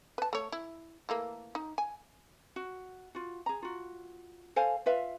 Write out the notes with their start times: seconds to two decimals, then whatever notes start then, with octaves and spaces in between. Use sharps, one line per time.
0.18 B4 A5
0.33 A3 C#5
0.52 E4
1.09 E3 A3 A#3
1.55 D#4
1.78 G#5
2.56 F#4
3.15 F4 F#4
3.46 G#4 A#5
3.62 F4 F#4
4.56 A4 C5 F5 G#5
4.86 F4 B4 E5 F5